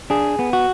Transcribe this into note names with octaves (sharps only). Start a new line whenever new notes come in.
D4 G#4
B3
F#4